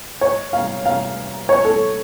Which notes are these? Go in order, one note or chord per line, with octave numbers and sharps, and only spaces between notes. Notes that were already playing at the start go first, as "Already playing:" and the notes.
C#5
F5
F5
C#5
A4